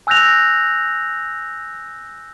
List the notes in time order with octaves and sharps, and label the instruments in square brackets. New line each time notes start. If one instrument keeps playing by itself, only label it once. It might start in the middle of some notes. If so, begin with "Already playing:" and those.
[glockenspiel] G#5 E6 F#6 G6 A#6 F7